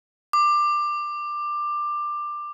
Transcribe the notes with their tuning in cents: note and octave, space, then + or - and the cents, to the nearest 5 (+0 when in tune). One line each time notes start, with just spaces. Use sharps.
D6 +15